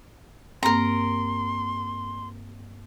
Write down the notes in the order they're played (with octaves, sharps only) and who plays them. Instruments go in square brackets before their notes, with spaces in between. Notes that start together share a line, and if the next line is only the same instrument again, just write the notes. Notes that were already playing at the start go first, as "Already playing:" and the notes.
[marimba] G2 A#3 C4 [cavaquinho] A#4 A#5 [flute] C6